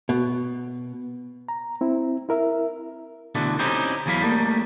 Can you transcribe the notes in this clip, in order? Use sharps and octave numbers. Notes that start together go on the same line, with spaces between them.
B2
A#5
C4 E4
E4 A#4 E5
B2 D3 E3 A3
C4 C#4 D#4 E4 G4 C5
E2 E3 F#3 E4 F5 B5
G3 A3 A#3